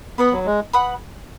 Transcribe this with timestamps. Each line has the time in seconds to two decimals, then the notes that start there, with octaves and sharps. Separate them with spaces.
0.18 B3 B4 F#5 B5 D#6
0.32 F#3
0.46 G#3
0.73 B4 F#5 B5 D#6